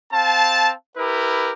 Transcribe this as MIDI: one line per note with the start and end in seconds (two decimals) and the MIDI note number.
0.12 0.72 60
0.12 0.72 77
0.12 0.72 81
0.97 1.52 64
0.97 1.52 67
0.97 1.52 70
0.97 1.52 71